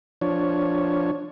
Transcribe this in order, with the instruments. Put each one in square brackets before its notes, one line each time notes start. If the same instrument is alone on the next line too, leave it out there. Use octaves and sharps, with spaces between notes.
[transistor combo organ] F3 D4 C#5